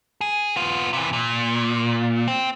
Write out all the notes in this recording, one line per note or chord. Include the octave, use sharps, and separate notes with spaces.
G#4
B3 F4
C3 E3
A#2
C4